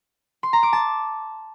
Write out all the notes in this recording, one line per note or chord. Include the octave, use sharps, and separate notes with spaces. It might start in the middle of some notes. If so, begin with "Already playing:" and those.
C6
A#5
D6
A5